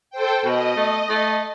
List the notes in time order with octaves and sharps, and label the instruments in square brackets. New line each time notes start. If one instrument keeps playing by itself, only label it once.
[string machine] A4 C5 G5
[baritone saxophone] B2 [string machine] D#5
[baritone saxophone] A3
A3